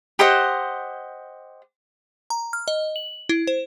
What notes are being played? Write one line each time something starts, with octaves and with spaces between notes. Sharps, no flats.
G4 C5 D#5 F#5
A#5
F6
D#5
F#7
E4
C5